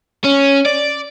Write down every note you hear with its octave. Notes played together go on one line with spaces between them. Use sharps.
C#4
D5